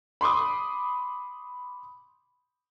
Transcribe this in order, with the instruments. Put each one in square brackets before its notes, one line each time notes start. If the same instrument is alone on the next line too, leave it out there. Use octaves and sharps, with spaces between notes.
[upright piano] B5 C6 D6 D#6